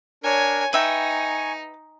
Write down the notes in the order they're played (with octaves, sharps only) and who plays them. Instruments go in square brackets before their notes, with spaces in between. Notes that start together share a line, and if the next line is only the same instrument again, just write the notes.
[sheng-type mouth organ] D4 A#4 [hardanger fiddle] C#5 G#5
[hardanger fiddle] D#4 [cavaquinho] B4 E5 G5 [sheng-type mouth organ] G#5 C#6